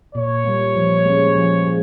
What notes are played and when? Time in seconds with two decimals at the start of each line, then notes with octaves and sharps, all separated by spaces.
0.15 A#2 C#5
0.45 G3 A#3
0.76 F3
1.06 G#3 C#4
1.36 F3
1.66 G#3